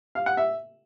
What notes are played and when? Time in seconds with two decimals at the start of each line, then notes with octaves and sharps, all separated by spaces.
0.15 F5
0.26 F#5
0.37 E5